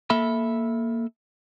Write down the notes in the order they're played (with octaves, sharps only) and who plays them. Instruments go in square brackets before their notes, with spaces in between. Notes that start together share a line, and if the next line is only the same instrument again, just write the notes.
[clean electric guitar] A#3 A4 E5 B5